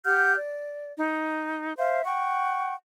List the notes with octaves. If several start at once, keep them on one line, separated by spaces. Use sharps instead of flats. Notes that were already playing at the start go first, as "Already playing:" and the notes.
G4 F#5 F6 G6
D5
D#4
C5 E5 F5
F#5 G5 C#6